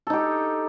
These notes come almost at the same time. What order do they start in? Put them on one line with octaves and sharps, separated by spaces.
A4 D#4 G4